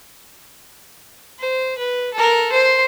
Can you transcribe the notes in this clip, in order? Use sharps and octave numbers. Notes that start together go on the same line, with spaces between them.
C5
B4
A4 A#4
C5 C6